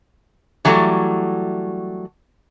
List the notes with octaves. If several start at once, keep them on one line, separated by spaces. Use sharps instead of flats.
E3 F#3 G3 A3